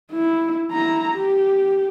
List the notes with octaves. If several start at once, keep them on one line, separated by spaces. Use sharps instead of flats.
E4
E4 A#5
G4